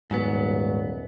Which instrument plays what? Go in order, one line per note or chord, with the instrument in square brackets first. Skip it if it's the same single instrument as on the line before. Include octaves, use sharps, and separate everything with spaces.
[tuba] D#1 [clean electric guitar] G#2 F#3 B3